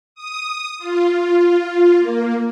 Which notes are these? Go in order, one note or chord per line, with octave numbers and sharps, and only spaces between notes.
D#6
F4
A#3